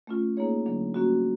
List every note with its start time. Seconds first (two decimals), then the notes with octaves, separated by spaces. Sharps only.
0.07 A3 C#4 F4
0.37 A#3 D#4 G#4 C#5
0.66 D3 F#3 A#3 D4
0.94 G3 A#3 C#4 F#4